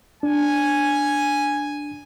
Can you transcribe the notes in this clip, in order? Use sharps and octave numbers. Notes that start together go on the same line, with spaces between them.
D4 G#5